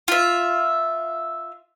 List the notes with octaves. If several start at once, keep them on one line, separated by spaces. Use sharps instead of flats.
F4 E5